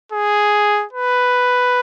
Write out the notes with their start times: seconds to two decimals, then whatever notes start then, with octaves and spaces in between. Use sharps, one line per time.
0.12 G#4
0.93 B4